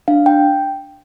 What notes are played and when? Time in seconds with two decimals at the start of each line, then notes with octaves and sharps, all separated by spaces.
0.08 D4 F5
0.26 G5